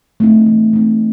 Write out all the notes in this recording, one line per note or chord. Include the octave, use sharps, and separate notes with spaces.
A3 C4 D#4
E3
A3 C4 D#4